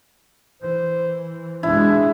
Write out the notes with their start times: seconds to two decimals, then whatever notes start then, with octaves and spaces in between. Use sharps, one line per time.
0.62 E3 C5
1.63 B2 G#3 D4 E4